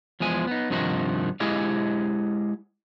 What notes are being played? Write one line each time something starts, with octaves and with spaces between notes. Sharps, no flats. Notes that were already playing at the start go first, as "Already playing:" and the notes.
E2 F3 G#3 G#5
B3 D#4
G2 C3 D#3 F3 D#4 F#4
G#3 E4 G4 G#4 D#5 F5